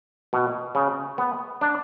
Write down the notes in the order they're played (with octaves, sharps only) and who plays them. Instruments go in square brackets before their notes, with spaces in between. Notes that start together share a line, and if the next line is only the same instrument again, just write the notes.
[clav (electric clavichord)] B2
C#3
B3
D4